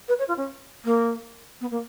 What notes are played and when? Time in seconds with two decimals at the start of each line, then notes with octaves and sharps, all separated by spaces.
0.08 B4
0.19 C#5
0.28 F4
0.37 C#4
0.85 A#3
1.61 B3
1.71 A#3